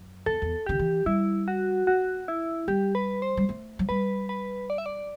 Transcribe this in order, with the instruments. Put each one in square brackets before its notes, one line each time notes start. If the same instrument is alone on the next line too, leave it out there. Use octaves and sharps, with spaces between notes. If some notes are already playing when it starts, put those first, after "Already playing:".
Already playing: [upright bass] F#2
[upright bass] E2 [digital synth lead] A4
[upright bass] E2
[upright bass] D3 [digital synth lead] G4
[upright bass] E3
[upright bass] G3 [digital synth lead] E4
[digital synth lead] F#4
[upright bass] A3 [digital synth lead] F#4
[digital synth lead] E4
[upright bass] G3 [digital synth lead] G4
[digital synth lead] B4
C5
[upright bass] G3
A3
F#3
[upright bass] G3 [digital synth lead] B4
[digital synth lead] B4
D5
E5
D5